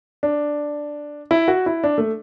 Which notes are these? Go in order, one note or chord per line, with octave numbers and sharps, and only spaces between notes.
D4
E4
F#4
E4
D4
A3